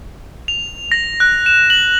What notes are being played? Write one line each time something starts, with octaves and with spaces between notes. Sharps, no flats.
F7
A#6
F#6
E7
F#7